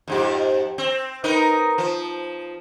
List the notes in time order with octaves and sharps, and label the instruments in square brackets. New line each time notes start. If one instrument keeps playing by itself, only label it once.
[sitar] F2 G#2 G4
C4
D#4 A#4 B4
F3